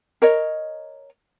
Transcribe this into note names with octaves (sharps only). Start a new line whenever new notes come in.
A#4 C#5 D#5